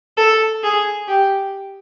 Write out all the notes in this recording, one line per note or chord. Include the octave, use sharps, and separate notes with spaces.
A4
G#4
G4